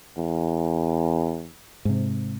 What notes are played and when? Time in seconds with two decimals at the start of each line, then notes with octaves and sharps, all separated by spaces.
0.18 E2
1.85 G#2 C3